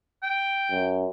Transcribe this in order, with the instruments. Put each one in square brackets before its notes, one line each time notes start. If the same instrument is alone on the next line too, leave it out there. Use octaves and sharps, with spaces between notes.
[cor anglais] G5
[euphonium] F#2